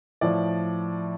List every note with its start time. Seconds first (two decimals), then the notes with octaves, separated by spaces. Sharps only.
0.21 A2 F3 D5